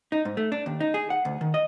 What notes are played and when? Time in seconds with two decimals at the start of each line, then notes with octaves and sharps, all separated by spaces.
0.12 D#4
0.25 G#2
0.37 A3
0.52 D4
0.66 D#2
0.80 D#4
0.94 G#4
1.10 F#5
1.25 D2
1.41 D#3
1.54 D#5